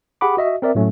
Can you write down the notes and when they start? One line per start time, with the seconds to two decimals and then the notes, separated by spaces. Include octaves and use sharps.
0.21 G4 G#4 F#5 B5 D6
0.37 F#4 D#5 E5
0.62 C4 A#4 D5 E5
0.75 A2 F#3 A3 C#4